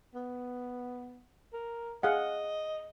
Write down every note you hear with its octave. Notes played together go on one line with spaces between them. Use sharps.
B3
A#4
G#4 D#5 F5 F#5